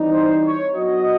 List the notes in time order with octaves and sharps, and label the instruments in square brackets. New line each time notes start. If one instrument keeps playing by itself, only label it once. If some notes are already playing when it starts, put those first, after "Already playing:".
Already playing: [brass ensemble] E3 G3 C4 D#4
[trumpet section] C5
C#5
[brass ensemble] F#3 B3 D4 F#4 [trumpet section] D#5